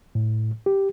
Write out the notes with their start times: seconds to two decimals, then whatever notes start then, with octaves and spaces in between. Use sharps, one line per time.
0.15 A2
0.66 G4